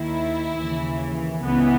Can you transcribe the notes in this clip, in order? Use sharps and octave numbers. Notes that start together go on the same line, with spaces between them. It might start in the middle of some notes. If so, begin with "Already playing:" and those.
Already playing: D#2 D#3 E4
D#2 C#3 E3
C#2 C#3 E3 B3